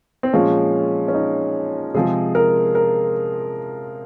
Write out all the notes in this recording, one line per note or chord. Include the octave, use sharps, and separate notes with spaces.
C4
A#2 F3 G#3 C#4
C#4
D#4
C3 F3 G#3 G#4
A#4
A#4